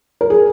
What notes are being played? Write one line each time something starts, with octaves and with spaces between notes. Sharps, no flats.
A#4
G#4